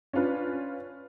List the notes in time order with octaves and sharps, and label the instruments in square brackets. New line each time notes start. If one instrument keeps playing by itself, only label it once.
[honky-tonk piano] C#4 D4 F4 B4